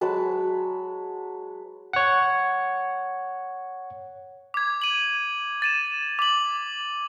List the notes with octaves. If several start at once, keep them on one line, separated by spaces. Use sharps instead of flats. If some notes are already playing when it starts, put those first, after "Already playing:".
F#3 G#3 B4 A5
C#5 F#5
D6 G#6
D#7 F#7
A6 D#7 E7
D6 F#7